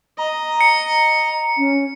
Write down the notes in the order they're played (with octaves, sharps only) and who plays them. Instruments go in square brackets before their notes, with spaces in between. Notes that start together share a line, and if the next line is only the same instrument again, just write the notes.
[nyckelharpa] D#5 [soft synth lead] A#5
[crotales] C#7
[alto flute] C#4